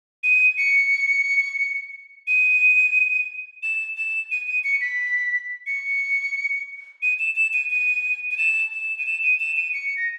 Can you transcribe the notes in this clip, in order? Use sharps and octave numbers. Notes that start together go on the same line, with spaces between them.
D#7
C#7
D#7
E7
E7
D#7
D#7
C#7
B6
C#7
D#7
E7
E7
D#7
D#7
D#7
E7
E7
D#7
E7
D#7
E7
D#7
C#7
A#6